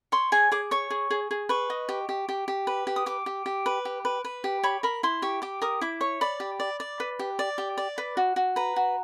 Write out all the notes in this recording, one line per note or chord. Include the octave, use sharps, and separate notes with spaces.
C#5 C6
G#4 G#5
G#4 D6
C#5 C#6
G#4
G#4
G#4
B4 C#6
D#5
G4
G4
G4
G4
B4
G4
D#6
G4 D6
G4
G4
B4
G4
B4
B4
G4
C#5 B5
A#4 B5
E4 C6
G4 C#6
G4 D6
A#4 D#6
E4 D6
C#5 C#6
D5 B5
G4
D5
D5
B4
G4
D5
G4
D5
B4
F#4
F#4
B4 A#5
F#4